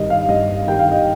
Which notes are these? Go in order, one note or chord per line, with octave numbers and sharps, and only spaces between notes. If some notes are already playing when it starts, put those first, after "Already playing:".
Already playing: G2 D#3 G3 D#5
F5
G2 D#5
D#3 G3 G5
F5
D#5